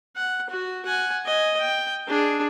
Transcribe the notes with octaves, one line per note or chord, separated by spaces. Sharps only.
F#5
F#4
F#5 G#5
D#5 G#5
G5
D4 G#4